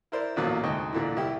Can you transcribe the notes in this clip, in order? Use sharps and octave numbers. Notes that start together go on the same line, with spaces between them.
E4 A#4 C5 D5
A1 E2 A#2 F#3 A#3
D2 G#2 C3 D#5 C#6
A#2 D3 E3
C2 E4 G4